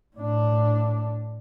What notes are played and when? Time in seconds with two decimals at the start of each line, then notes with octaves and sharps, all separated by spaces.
0.16 A2 D4